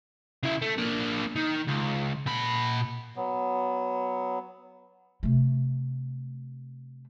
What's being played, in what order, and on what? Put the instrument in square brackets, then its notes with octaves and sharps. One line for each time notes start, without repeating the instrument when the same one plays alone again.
[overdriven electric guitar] C#3 E4
A3
A#3 D4
D#3
C#2
A#2 B5
[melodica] F#3 B3
[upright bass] C3 A3